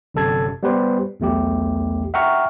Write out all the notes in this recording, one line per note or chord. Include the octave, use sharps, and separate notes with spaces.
G1 F#2 C3 A4 A5 G#6
G3 B3 G4 B4 C5
B1 E2 A3 G4
E5 F#5 G5 A#5 C#6 F6